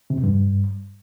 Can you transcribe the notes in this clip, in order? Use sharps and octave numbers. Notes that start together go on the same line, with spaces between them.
C3
E2
G2